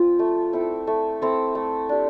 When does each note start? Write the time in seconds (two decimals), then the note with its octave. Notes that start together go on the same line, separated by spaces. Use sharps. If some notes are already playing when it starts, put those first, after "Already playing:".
Already playing: F3 C4 F4
0.19 A3
0.53 C4 E4 A4
0.87 A3
1.22 C4 E4 A4
1.55 A3
1.89 D4 G4